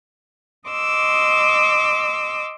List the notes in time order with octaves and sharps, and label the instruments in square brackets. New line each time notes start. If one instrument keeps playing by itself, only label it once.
[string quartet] D#5 C6 D6 E6